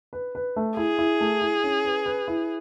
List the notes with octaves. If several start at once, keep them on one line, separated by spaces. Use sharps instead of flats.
B4
B4
A3
E4 G#4
E4
A3
E4
C#4
B4
B4
E4